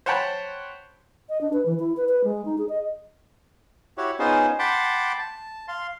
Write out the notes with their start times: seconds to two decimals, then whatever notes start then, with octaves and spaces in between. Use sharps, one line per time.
0.06 C5 C#5 F#5 G5 A5 B5
1.29 D#5
1.41 D4
1.53 B4
1.66 E3
1.79 E4
1.97 B4
2.09 B4
2.24 G#3
2.45 D#4
2.58 G#4
2.69 D#5
3.98 E4 F#4 G4 C#5
4.19 B3 C#4 D#4 F4 G#4 C5
4.59 F#5 G5 A5 B5 C6 D6
5.18 A5
5.68 F5 C6